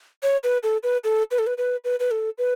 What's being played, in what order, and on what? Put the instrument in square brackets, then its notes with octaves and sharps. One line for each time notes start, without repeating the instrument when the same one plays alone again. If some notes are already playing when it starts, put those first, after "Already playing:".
[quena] C#5
B4
A4
B4
A4
B4
A4
B4
B4
B4
B4
A4
B4